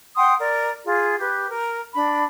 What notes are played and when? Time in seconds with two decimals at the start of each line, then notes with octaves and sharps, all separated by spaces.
0.17 F#5 G5 C6 D#6
0.39 A#4 D5
0.85 F4 G#4
1.19 G4 B4
1.48 A#4
1.94 D4 B5